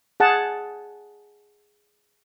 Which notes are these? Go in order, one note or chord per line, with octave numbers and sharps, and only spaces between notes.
G#4 F#5 A5